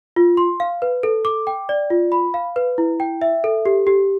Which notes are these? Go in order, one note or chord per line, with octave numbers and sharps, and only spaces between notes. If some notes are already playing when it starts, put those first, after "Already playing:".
F4
C6
F5
B4
A4
D6
G5
D5
F4
B5
F5
B4
E4
G5
E5
A4
G4
G4